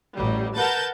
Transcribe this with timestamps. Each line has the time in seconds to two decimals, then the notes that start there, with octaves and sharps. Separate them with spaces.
0.15 A1 F#3 G3
0.57 A#4 B4 F#5 A5 G6 A6